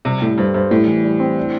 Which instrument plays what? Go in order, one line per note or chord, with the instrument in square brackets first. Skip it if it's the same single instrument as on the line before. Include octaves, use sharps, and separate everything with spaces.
[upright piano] C3 [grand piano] G3
[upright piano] A2 [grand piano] A4
[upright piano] G2 [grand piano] C5
[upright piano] G2 [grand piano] C5
[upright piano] A2 [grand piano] G3
[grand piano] E3
G3
C4
D4